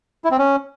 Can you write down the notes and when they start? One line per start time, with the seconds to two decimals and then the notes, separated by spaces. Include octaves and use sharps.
0.24 E4
0.31 C4
0.39 C#4